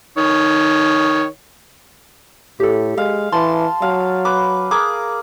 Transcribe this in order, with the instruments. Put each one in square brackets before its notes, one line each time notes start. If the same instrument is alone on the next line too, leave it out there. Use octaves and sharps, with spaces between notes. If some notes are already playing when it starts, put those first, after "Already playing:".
[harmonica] D#3 C#5
[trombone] A2 [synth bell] G4 A4
[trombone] G#3 [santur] F5
[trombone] E3 [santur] A5 [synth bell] C6
[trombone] F#3 [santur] F5
[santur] B4 [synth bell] D6
[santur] G#4 A#4 [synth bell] D6